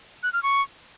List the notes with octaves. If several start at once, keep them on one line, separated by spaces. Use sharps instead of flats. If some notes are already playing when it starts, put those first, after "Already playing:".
F#6
F6
C#6